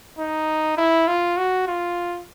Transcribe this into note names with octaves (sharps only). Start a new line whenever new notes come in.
D#4
E4
F4
F#4
F4